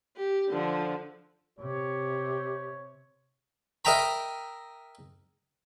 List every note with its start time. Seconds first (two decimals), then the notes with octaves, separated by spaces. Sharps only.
0.16 G4
0.49 D3 F3
1.59 C3 G4 C#5
3.85 A#4 D#5 E5 G5 A#5 B5